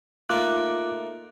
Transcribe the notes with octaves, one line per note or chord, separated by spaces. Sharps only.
A3 A#3 D#4 F4 D6 F#6